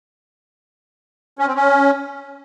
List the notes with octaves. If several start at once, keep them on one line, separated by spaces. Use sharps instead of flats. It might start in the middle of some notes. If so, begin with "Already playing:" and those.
C#4
C4
C#4